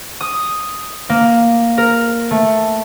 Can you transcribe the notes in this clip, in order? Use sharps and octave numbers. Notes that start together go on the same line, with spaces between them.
D#6
A#3
A#4
A3